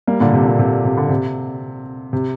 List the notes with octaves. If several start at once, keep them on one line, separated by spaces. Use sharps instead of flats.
G3 A#3
A#2 D3
C3
A#2
C3
C3
D3
C3
C3